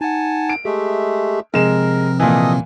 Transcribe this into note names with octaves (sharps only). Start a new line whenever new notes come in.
D#4 F#5 G#5 A5
D7
G#3 A3 G4 G#4 E5
C3 F3 G#3 C4 A#4 E7
A#2 E3 A4 D#5 D#6